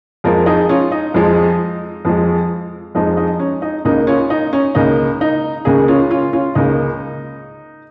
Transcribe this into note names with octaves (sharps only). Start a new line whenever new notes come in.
F2 F3 G#3 F4 A#4
D#4 G#4
C#4 F4
D#4
F2 F3 G#3
F2 F3 G#3
F2 F3 G#3 D#4
D#4
C#4
D#4
C#2 C#3 A#3 D#4
C#4 F4
D#4
C#4
C#2 C#3 A#3 D#4
D#4
C#2 C#3 A#3 D#4 G#4
C#4 F4
C#4 F4
C#4 F4
C#2 C#3 A#3 D#4